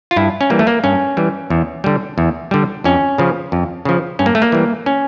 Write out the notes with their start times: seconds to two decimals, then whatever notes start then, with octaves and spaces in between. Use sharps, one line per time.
0.11 F4
0.16 G2 E4
0.41 C#4
0.50 E3 G3 A#3
0.59 A3
0.67 A#3
0.84 G2 C#4
1.17 E3 G3
1.50 E2
1.84 D3 G3
2.18 E2
2.51 D3 G3
2.84 F2 C#4
3.18 C#3 F3
3.52 F2
3.85 C#3 F3
4.19 G2 C#4
4.26 A#3
4.35 A3
4.42 A#3
4.52 E3 G3
4.86 C#4